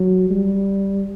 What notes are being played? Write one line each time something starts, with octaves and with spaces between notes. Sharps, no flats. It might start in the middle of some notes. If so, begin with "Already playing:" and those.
Already playing: F#3
G3